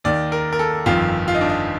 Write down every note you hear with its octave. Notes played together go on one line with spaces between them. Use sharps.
D#2 D#3 D5
A#4
A#4
A4
G1 F2 D#3 F4
F4
D#4
D4
D#4